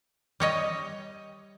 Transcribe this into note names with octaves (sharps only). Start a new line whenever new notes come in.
G3 C#5 D#5